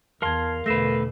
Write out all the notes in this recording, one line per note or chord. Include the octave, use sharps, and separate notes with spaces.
E2 A#4 F5 A5 C6 G#6
E2 B2 D3 A3 B4 A#6 C7 E7